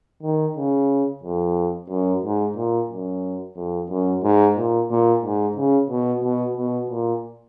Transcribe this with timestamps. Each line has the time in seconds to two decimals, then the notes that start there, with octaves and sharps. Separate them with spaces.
0.23 D#3
0.57 C#3
1.23 F2
1.90 F#2
2.24 G#2
2.57 A#2
2.90 F#2
3.56 F2
3.90 F#2
4.24 G#2
4.57 A#2
4.90 A#2
5.24 G#2
5.56 C#3
5.90 B2
6.23 B2
6.57 B2
6.90 A#2